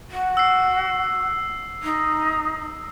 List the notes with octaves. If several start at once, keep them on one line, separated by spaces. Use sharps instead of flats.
F#4
E6 C7
D#4